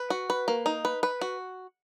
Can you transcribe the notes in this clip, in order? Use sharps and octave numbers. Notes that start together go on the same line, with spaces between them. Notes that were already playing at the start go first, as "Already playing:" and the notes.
Already playing: B4
F#4
B4
A#3
D#4
B4
B4
F#4